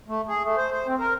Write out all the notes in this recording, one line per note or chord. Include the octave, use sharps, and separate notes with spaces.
A3
G#4
A3
C5
C5
C4
A#4